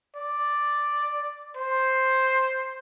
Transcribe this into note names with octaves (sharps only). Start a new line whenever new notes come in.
D5
C5